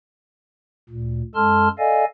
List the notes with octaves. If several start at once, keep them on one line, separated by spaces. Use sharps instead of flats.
D2 A#2
F#2 G#3 A4 A5 C6 F6
A4 D5 D#5 F5 G#5